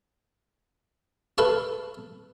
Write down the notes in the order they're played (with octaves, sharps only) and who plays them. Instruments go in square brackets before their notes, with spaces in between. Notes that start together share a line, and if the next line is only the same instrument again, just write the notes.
[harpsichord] A4 B4 F5 A5 C#6